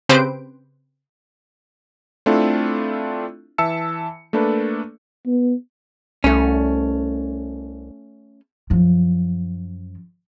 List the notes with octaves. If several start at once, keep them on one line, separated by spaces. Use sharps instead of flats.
C#3 C4 G4 B4 C5 D7
A3 C4 D4 E4 F4 A4
E3 E5 A5 E6 C#7
A3 A#3 D4 A4 B4
B3
C2 A3 C#4
F#2 F3